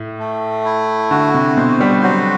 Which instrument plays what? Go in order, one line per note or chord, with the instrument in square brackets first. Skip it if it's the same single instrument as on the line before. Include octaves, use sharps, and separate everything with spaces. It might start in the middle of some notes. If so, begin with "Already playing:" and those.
Already playing: [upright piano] A2
[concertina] A3
E4
[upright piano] D3 [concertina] F#4
[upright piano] C3
[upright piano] B2 [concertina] C5
[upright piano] G3
[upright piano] F#3 [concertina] F#4